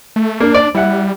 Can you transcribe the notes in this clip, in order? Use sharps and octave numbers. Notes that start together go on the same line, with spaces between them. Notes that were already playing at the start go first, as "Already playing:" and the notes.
A3
A#3 D4
D5
G3 E4 F#5